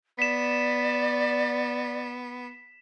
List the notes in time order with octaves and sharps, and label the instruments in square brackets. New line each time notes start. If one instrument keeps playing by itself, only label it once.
[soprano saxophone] B3 [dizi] D5 [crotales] B6 E7